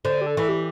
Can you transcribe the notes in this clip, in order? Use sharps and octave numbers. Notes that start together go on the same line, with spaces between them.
D3 C5
G4
A4
E3
G4